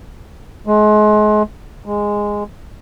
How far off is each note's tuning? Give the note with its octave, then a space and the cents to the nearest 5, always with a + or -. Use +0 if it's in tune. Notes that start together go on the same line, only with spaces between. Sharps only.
G#3 +35
G#3 -10